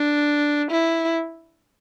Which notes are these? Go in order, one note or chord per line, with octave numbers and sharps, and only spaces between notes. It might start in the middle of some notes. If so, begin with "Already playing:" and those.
Already playing: D4
E4